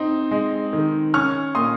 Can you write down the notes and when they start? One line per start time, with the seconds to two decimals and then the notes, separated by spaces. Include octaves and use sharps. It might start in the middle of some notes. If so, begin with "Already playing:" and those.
Already playing: C4 D#4
0.31 G#3
0.73 D#3
1.14 C#4 C#6 F6
1.55 A#2 C6 D#6